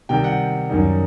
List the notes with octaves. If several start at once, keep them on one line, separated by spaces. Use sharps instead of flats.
C3 D#3 G3 G5
F#5
F#2 D#3 G3 D#4